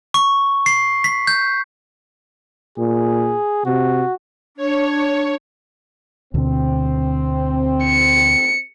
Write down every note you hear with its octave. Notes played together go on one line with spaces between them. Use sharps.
C#6
C7
B6
G6
A#2 G#4
C3 F#4
D4 C#5
D2 B2 D3 C4
C#7